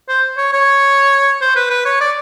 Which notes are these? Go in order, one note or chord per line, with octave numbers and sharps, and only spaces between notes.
C5
C#5
C#5
C5
B4
B4
C#5
D5